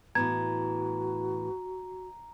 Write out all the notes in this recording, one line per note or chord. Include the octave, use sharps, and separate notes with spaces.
A2 E3 B3 F#4 A#5 G#6